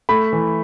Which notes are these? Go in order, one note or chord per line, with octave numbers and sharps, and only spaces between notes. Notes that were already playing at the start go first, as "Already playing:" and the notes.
A3 B5
E3